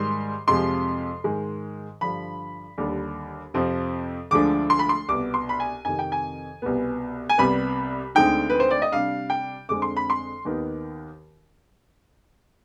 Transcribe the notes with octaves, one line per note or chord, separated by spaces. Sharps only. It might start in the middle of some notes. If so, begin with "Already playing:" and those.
Already playing: G#2 D#3 G3 C6
F2 C3 F3 G#3 C6
G#2 D#3 G#3
G2 D3 F3 B5
D#2 D3 G3 D4
F2 C3 F3 C4
D2 D3 F3 G#3 D4 D6
C6
B5
C6
C2 B2 B3 D6
C6
B5
G#5
F2 C3 D#3 G#5
G5
G#5
C2 B2 B3
G#5
C2 C3 G3 B3 B5
D2 D3 G#3 C4 D#4 G5
B4
C5
D5
D#5
C3 G3 D4 F5
G5
F2 D3 G#3 C4 D6
C6
B5
C6
D#2 D#3 B3 D#4